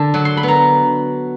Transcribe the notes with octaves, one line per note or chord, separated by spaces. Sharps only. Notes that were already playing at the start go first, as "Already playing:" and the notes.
Already playing: D3 A5
F#3
C6
B5
B3
A#5